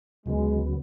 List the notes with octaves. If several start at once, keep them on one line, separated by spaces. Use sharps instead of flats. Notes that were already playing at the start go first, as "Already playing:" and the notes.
D2 C#3 F#3 G#3 B3